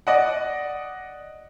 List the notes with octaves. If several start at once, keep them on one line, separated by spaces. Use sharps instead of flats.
D5 D#5 F#5